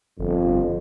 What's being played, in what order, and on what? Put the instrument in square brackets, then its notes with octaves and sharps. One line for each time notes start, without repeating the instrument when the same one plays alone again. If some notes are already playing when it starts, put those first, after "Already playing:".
[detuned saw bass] G1 [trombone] F2